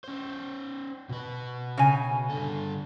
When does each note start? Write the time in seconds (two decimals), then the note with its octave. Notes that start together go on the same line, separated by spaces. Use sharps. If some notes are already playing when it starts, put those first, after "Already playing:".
0.04 C#4 C5
1.09 B2 B4
1.77 C#3 G#5
2.30 G2 D3 A4